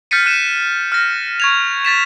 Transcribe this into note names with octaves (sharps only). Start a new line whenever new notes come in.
F6 G6 A6 B6 C#7 D#7
F#6 D#7 E7
F6 A#6
C#6 G#6 F7
G#6 A6 B6 E7